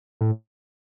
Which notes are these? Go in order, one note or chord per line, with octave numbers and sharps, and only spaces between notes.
A2